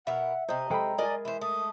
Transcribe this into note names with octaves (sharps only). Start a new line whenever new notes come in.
B2 A#4 E5 F#5
C3 C5 D#5 A#5
G#3 A4 C5 G5 B5
G#4 A#4 D5 D#5 G#5
E3 C5 E5
A3 D#6